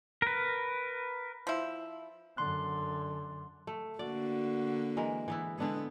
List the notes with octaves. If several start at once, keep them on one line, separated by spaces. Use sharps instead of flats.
A#4 B4
F3 E4
F#2 D3 C6 F#6
A3
D3 A#3 F#4 D5
E3 G#3 A#4
E3 B3 E4
D3 G#3 B3 D4 G#4